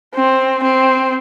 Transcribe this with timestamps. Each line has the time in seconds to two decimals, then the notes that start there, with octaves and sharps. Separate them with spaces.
0.15 C4
0.63 C4